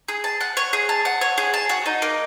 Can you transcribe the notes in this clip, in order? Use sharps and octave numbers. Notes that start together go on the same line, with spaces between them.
G#4
A5
F#5
C#5
G#4
A5
F#5
C#5
G#4
A5
F#4
D#4
A#3